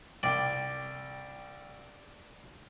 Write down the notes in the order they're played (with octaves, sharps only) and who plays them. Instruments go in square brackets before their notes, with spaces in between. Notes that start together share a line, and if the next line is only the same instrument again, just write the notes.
[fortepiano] C2 G5 [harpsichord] D5